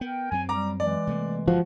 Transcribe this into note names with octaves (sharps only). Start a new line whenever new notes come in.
B3 A#4 G5
F#2 F#3 C4 G#5
G3 A#5 D6
E3 G#3 D5
C3 A3 A#3
G1 C#3 F3 F#4